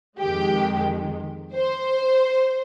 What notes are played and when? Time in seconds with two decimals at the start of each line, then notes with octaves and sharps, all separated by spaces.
0.19 F2 D#3 G#3 G4
1.54 C5